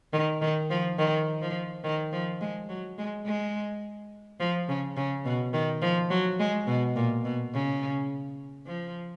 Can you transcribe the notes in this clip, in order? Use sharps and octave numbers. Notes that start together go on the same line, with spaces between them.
D#3
D#3
F3
D#3
F3
D#3
F3
G#3
F#3
G#3
G#3
F3
C#3
C#3
B2
D#3
F3
F#3
G#3
B2
A#2
B2
C#3
F3